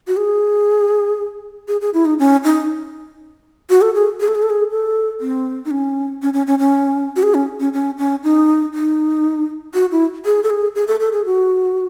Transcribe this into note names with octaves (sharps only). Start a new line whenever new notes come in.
F#4
G#4
G#4
G#4
E4
D#4
C#4
D#4
F#4
A4
G#4
G#4
A4
G#4
A4
G#4
A4
C4
D#4
C#4
C#4
C#4
C#4
C#4
F#4
G#4
C#4
C#4
C#4
C#4
D#4
D#4
F#4
E4
G#4
A4
G#4
G#4
A4
A4
G#4
F#4